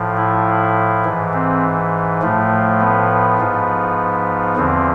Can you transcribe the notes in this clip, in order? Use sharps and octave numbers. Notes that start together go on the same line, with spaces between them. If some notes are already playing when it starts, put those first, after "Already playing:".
Already playing: A2 F3
E4
G#2 E3
C4
A2 F3 A3
B3
G#2 F3
E2 D3 F3 C4